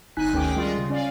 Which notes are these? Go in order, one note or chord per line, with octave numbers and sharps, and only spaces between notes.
G1 D#4 G#5 F#6 B6
D2 D#3 C#4 G#4 G5 D6
G3 G#3 F4 G#4
C#3
C#4 D5 F5